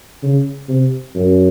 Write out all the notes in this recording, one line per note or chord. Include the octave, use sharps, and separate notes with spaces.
C#3
C3
F#2